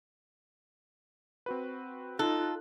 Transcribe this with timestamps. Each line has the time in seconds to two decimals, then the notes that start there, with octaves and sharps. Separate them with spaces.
1.46 C4 F#4 B4
2.19 D#4 F4 A4 F#6